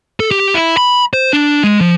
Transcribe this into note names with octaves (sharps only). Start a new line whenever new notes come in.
A4
G4
E4
B5
C5
D4
G#3
F3